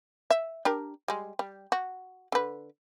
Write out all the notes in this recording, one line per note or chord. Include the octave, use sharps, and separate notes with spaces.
E5
D4 G4 A#4
G3 G#3
G3
F#4
D3 B4